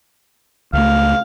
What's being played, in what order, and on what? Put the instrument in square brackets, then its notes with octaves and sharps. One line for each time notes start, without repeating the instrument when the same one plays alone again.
[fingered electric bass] C#2 A3 [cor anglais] F5